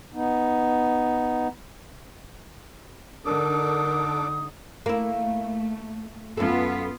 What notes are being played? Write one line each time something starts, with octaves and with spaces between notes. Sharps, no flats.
B3 D#4
D3 D4 D#4 A4 A#4 D6 D#6
A3 A#3 E4
F#2 B3 F4 A4